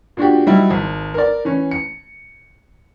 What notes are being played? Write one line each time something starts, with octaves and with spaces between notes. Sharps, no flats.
A#2 D4 F#4 G4
F#3 G3 D#4 E4
G#1
A#4 D5
E3 C#4
C#7